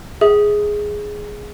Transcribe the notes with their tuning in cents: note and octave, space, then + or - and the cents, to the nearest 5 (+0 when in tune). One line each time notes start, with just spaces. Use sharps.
G#4 +0 E5 -30